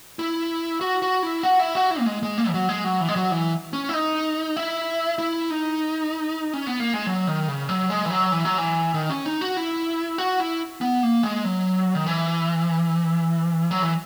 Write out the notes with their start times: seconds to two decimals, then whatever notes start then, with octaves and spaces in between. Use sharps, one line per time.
0.19 E4
0.81 F#4
1.02 F#4
1.23 E4
1.43 F#4
1.59 E4
1.75 F#4
1.91 E4
1.99 A#3
2.06 G#3
2.23 G#3
2.38 A#3
2.49 E3
2.54 F#3
2.69 G#3
2.84 F#3
3.01 E3
3.08 G#3
3.16 F#3
3.31 E3
3.73 C#4
3.89 E4
3.94 D#4
4.57 E4
5.18 E4
5.50 D#4
6.54 C#4
6.67 B3
6.80 A#3
6.94 G#3
7.07 F#3
7.27 D#3
7.48 C#3
7.69 F#3
7.90 G#3
8.05 E3
8.10 F#3
8.32 E3
8.45 F#3
8.58 E3
8.94 D#3
9.09 C#4
9.26 D#4
9.41 F#4
9.57 E4
10.18 F#4
10.40 E4
10.81 B3
11.03 A#3
11.23 G#3
11.44 F#3
11.95 D#3
12.06 E3
13.71 F#3
13.82 E3